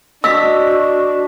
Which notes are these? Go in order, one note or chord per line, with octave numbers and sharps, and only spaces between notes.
D4 F#4 D#5 E6 B6